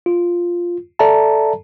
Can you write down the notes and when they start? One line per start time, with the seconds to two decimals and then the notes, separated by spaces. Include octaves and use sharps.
0.06 F4
0.99 A4 D5 E5 A5 A#5